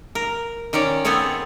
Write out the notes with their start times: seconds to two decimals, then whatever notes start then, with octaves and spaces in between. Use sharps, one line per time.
0.15 A#4
0.73 D#3 C#4 C#5 D5
1.05 B3 C4 G#4 A4 C#5